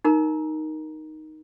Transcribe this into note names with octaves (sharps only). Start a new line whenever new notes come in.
D#4 A#4 A#5